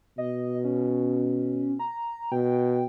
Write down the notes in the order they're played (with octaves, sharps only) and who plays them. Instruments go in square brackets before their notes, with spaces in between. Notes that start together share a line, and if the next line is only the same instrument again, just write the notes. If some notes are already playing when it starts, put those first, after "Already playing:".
[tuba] B2 [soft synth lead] D#5
[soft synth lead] C#4
A#5
[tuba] B2 [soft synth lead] G5